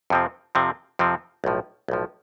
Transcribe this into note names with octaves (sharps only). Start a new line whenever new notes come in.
F2 C3 F3 C4
F2 C3 F3 C4
F2 C3 F3 C4
B1 A2 F3
B1 A2 F3